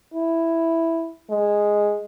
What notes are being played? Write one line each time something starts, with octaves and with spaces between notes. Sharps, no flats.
E4
G#3